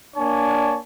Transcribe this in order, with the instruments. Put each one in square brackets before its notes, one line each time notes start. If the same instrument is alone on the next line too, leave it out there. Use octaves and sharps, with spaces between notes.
[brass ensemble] A#3 D4 C#5 D5 G#5 A5